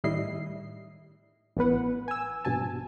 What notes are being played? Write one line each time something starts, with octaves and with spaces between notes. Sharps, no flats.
A2 D#3 G3 E4 D#5 C7
A1 E3 B3 B4 F#5
G#5 E6
A#1 G2 B2 G#5 A5